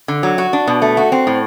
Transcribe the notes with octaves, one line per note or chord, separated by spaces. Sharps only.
D3
F#3
F#4
D4
B2
A3
F#4
C4
A2